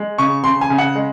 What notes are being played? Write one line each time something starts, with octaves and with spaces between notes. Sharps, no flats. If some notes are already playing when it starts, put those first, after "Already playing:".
Already playing: G#3
C#3 C#6
C#3 C6
G#5
C#3
F#5
G#3